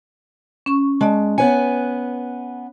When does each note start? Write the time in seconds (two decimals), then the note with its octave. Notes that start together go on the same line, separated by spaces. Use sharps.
0.66 C#4 C#6
1.01 G#3 D5 A5
1.38 B3 B4 C#5 G#5